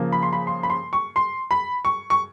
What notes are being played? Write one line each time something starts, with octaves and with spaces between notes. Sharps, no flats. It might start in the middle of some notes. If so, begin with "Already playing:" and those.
Already playing: C#3 F3 A#3
B5
C6
B5
C6
B5
C6
C#6
C6
B5
C#6
C#6